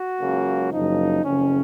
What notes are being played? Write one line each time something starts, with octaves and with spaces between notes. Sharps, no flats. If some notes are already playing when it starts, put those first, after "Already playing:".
Already playing: F#4
C#2 C#3 F#3 A#3
F#1 F#2 F3 D#4
F#1 F2 C#3 C#4